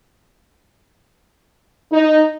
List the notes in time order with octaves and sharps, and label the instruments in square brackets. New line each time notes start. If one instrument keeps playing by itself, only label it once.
[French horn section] D#4